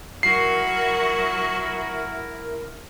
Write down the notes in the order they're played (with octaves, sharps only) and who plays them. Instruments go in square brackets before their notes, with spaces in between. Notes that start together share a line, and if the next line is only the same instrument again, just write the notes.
[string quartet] F#3 F#4 [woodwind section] E4 A#4 [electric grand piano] C7